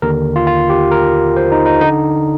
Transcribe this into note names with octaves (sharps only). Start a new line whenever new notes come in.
D#2 D3 A#4
F4
F4
G4
A#4
C5
D#4
D#4
D3 D#4